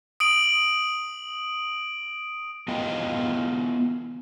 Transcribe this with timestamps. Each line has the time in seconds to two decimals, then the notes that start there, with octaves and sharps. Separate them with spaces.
0.20 D#6 D7 F#7
2.68 B3 E4 F4 D#5 G5